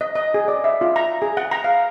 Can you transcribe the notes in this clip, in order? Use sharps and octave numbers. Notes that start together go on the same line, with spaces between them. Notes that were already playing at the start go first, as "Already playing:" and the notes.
D#5
D#5
G#4
D5
E5
F4
A#5
G#4
F#5
A#5
F5